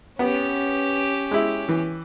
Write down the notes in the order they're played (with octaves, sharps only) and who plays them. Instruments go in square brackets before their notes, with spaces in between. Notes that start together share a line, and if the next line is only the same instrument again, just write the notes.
[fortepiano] B3 [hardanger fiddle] C#4 G4
[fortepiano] G#3 E4
E3